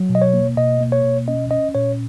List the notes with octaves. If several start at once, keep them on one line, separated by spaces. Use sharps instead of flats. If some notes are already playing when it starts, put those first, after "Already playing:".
Already playing: F#3
B2
D#5
C#5
A#3
B2 D#5
A#3
C#5
B2
C#4 D#5
C#4 D#5
A#2 C#5